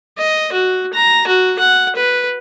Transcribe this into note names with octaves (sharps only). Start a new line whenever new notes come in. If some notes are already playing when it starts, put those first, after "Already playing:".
D#5
F#4
A#5
F#4
F#5
B4